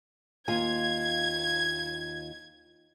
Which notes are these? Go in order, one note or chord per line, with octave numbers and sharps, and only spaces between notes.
D#2 F4 G#5 G#6